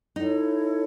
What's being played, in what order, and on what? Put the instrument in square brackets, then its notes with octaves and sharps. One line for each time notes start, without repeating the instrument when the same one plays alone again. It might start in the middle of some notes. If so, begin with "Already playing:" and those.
[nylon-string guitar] D#4 [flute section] E4 A4 C#5